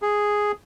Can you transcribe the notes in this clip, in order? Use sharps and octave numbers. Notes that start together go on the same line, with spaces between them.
G#4